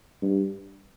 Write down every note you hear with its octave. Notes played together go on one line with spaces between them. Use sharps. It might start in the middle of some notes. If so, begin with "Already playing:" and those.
G2